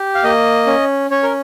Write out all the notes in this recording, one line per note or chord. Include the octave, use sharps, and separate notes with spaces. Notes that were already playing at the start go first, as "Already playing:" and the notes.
Already playing: G4
F5
A#3 D#5
C#4
C#4 C#5
A#4